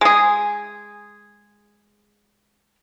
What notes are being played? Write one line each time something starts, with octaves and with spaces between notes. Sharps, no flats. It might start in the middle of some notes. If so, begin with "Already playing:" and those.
G#3 G#4